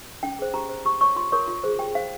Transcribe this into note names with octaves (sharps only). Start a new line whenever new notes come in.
C#4 G5
G#4 C5
G4 A#5
C5
G4 C#6
C#5 C#6
F4 C6
A#4 C#5 C#6
F4
G#4 C5
G4 G5
C5 F5